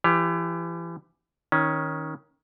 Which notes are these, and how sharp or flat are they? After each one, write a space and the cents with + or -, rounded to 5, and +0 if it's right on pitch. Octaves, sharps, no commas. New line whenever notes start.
E3 +35 G4 +20
D#3 +20 C#4 +0